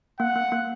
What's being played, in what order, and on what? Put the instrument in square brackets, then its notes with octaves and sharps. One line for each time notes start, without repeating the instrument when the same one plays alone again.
[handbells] A#3 [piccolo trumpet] F#5
[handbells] A#3
A#3